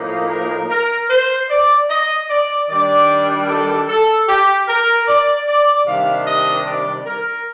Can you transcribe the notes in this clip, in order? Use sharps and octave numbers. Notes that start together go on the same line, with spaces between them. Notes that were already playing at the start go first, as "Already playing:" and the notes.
Already playing: A2 F3 A#3 D#4
A#4
A#4
C5
D5
D#5
D5
D#3 G3 D4 D5
A4
A4
G4
A#4
D5
D5
C3 D#3 G3 D4 F5
D#5
D5
A#4